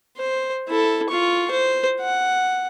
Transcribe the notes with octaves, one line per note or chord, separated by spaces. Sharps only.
C5
E4 A4
F4 C#6
C5
F#5